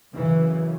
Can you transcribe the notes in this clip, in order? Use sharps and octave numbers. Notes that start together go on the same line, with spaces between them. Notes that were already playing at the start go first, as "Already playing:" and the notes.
F#2 C#3 E3